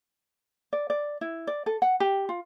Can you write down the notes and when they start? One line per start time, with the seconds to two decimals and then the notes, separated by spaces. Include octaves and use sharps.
0.73 D5
0.90 D5
1.21 E4
1.47 D5
1.66 A4
1.82 F#5
2.00 G4
2.29 F4